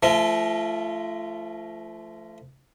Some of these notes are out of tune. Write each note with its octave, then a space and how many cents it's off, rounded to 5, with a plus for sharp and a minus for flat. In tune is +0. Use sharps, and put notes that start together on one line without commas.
F3 -30 A3 +0